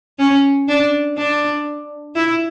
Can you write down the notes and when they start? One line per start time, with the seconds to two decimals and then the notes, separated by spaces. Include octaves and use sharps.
0.19 C#4
0.68 D4
1.17 D4
2.15 E4